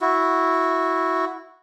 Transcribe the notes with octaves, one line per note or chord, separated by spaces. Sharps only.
E4 F#4